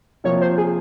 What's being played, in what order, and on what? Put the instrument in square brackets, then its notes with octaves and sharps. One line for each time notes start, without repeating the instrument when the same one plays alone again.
[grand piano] C3 F3 A#3 F4 [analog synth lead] C#5
[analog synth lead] C5
G#4